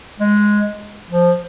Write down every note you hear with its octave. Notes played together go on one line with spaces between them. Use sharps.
G#3
F3